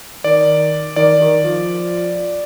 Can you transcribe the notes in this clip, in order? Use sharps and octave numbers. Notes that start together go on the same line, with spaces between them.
D#3 D5
D#3 D5
D#3
F3